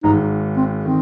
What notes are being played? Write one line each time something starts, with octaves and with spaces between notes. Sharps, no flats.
G#1 G#2 D#3 D#4
C4
D#3 C4